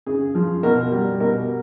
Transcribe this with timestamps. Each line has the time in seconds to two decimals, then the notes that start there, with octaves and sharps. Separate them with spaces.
0.06 C#3 G#4
0.35 F3
0.63 B2 A#4
0.92 G3
1.20 B2 A#4